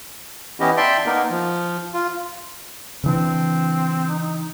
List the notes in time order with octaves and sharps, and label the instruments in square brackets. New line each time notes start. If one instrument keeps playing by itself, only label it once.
[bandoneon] E3 B3 C#4 E4 G4 D#5
D5 E5 G5 A5 C6
A#3 B3 D#4 A#4
F3
F4
[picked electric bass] C#3 E3 D4 [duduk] C4
[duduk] D#4